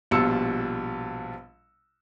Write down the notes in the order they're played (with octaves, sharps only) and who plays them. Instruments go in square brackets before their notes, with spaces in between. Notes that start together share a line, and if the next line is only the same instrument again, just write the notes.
[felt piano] A#1 B2 G3 F4 E6 C#7